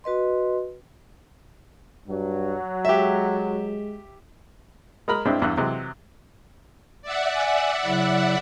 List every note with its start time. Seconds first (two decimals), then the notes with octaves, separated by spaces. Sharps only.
0.04 F#4 B4 D#5 C6
2.08 G2 F#3
2.85 G#3 G4 E5
5.08 G#3 A#4 B5
5.25 G2 G#3 C4 D4 E4
5.42 E2 G2 E3 F#6
5.57 C3 E3 F#3 G#3
7.02 D5 E5 F#5
7.35 G#5
7.85 C#3 F#3 E4